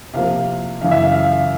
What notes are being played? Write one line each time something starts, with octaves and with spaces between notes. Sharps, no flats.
C3 F3 A#3 F5
F#2 C#3 E3 F5
E5
F5
F5